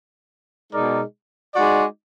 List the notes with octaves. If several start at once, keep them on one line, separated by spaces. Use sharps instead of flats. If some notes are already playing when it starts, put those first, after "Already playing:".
B2 G#3 D#4 A#4 D5
G#3 D#4 F#4 D5